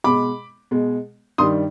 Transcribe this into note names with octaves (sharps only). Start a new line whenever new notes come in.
B2 G#3 B5 D6
B2 G#3
G2 D#3 G3 C6 D#6